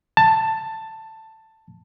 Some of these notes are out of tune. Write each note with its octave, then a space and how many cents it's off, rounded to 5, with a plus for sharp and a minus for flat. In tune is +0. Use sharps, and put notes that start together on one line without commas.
A5 +10